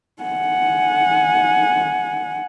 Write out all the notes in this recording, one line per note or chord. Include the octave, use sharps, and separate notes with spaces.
F#5 G#5